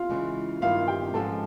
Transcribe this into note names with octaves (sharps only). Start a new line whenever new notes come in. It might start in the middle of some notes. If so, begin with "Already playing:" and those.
Already playing: F4 F5
C#3 E3 G#3
G2 D#3 G3 B3 E4 F4 F5
G4 G5
G#2 F3 G#3 C#4 A4 A5